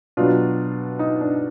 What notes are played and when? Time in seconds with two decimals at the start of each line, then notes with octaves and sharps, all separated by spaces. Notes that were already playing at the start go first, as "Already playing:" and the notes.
0.17 B2 F#3 D4 F4
0.99 D#4
1.21 D4